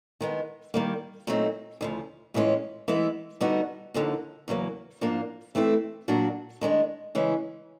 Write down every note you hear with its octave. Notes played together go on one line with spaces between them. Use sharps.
D#3 G#3 B3
D#3 G3 A#3
A#2 F#3 A3 C4 D#4
D2 C#3 F3
A2 E3 G#3 C#4 F4
E3 G#3 B3 E4
D3 G3 B3 D#4 F#4
D#2 D3 F3 A#3
E2 C#3 F#3 A#3
G#2 F3 A#3 D4 F4
E3 A3 C4 E4
A#2 F#3 A#3 D4 F#4
D#3 G#3 B3 D4
C#3 E3 G#3 C#4